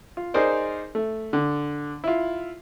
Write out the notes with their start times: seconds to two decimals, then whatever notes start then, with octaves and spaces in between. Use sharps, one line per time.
0.17 F4
0.34 D#4 G#4 A#4 C5 D5
0.95 A3
1.33 D3
2.04 E4 F4